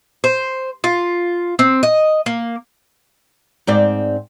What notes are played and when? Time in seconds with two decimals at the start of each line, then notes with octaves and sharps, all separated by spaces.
0.24 C5
0.84 F4
1.59 C4
1.83 D#5
2.26 A#3
3.67 G#2 C4 D5